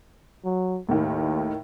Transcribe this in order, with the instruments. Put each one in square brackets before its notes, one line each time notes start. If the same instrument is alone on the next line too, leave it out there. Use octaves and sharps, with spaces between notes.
[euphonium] F#3
[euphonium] D#2 [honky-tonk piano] A2 D#3